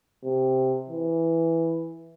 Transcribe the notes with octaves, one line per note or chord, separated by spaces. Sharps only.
C3
E3